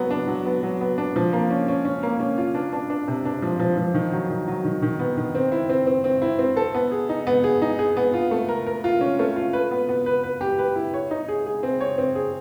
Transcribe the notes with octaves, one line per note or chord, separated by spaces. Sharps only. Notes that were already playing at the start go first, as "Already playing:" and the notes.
Already playing: F#3 B3
D4
F#3
B3
F#3
B3
D4
F3
A#3
C#4
C#4
C#4
A#3
C#4
F4
D4
D4
D4
C3
D4
F3
F3
F3
D#3
F#3
D#3
F#3
D#3
D#3
B3
D#3
C4
E4
C4
C4
C4
E4
C4
A4
B3
G#4
D#4
B3
G#4
D#4
G#4
B3
F4
A3
A#4
A#4
F4
C#4
A3
F4
B4
B3
B3
B4
B4
G4
B4
E4
C#5
D#4
G#4
G#4
C4
C#5
C4
G#4